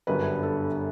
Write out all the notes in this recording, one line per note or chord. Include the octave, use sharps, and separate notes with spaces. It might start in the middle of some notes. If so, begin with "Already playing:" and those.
G1 F#2 D3 G3 B4
A4